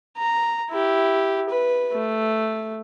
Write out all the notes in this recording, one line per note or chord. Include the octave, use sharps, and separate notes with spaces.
A#5
E4 G4
B4
A3